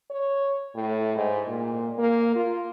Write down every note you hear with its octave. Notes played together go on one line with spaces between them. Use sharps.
C#5
A2
G#2
A#2
A#3
F4